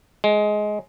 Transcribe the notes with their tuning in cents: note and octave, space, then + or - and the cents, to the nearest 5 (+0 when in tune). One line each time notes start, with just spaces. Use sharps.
G#3 +15